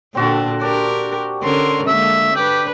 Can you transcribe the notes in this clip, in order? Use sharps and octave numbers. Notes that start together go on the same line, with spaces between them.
A#2 D3 C4 D4 F#4 A4
D4 G4 A#4
D3 C#4 A#4 C6
D3 G#3 A#3 E5
D4 G4 B4